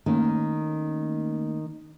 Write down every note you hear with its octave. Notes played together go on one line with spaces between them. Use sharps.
D#3 A3 A#3 C#4